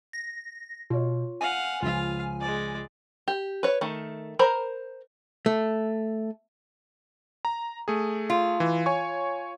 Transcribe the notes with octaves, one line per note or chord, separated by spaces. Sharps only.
A#6
B2 F4 C#5
F5 F#5 G#5
C#2 F3 F4 F5
G#3 D5
G4
B4 C#5
D#3 A3
A#4 C5 A#5 B5
A3
A#5
A3 G#4
F4
E3
C#5 G#5 C#6